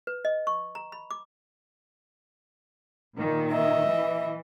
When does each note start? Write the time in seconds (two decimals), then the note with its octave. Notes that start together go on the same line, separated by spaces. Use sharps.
0.07 B4
0.25 D#5
0.47 C#6
0.75 A#5
0.92 B5
1.11 D6
3.17 A#2 D#3
3.51 D#5 E5
3.88 E3